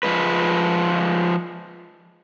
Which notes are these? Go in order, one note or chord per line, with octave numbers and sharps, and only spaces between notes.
F3 G#3 B4